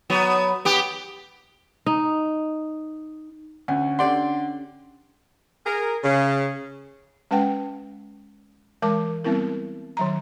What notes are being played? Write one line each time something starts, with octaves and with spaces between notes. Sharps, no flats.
F#3 B3
B3 G4
D#4
D2 C#4 F#5
D3 G4 D5 F#5 C6
G#4 A#4
C#3
G#3 C#4 B4 F#5 G5
E3 G#3 A#4 A5 D6
G3 B3 C4 E4 A#4
D#3 F#3 A#5